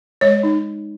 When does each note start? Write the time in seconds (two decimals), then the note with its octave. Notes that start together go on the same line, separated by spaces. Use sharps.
0.21 G#3 C#5
0.43 D#4